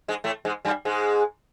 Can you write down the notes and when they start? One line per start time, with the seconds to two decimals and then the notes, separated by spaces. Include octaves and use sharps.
0.08 G#2 G#3
0.24 A2 A3
0.45 G#2 G#3
0.65 G2 G3
0.85 G#2 G#3